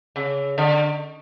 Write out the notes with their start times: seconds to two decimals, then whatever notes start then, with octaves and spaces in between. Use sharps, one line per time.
0.16 C#3
0.58 D3